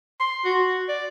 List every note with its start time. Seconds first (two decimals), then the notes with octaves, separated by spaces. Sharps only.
0.20 C6
0.45 F#4
0.89 D5